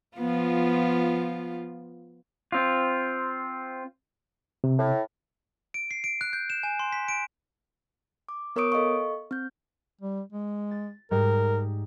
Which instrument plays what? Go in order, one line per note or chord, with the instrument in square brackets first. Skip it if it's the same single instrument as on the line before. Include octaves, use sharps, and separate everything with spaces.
[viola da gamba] F3 B3 F4
[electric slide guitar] C4 F4
[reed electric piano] C3
[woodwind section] A2
[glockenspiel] D7
C7
D7
F#6
G6
E7
G#5
C6
B6
D7
[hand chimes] D6
B3 A#4 C#5 C#6 D#6 D7
A4 D#5 F5 C#6
C4 G6
[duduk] G3
G#3
[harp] A6
[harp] G#2 G3 D#4 [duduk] A#4